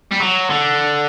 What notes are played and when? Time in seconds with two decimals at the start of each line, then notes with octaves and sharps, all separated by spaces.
0.12 G3
0.20 F#3
0.50 D3